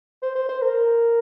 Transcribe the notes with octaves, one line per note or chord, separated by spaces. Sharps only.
C5
C5
C5
A#4